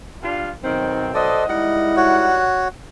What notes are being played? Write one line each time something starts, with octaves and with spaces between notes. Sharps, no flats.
G2 D4 F4
B1 D#3 C4
F#4 A4 C5 D5 D#5
D#3 G3 G#3 E4 D#5 F#5
F#4 C#5